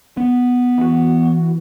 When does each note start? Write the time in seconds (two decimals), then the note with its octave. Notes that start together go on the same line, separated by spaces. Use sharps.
0.17 B3
0.78 E3 F#4